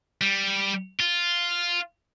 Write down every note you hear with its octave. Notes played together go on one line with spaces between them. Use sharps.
G3
F4